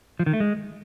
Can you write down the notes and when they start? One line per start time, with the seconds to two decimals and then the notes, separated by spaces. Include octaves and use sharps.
0.19 F3
0.26 D#3
0.33 A3
0.40 G#3